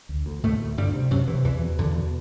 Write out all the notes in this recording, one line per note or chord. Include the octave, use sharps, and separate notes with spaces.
D2
D2
D2 A2 A3
D2
D2 G2 G3
C3
F#2 C3 F#3
C3 E3
E2 E3
B2
E2 D3
B2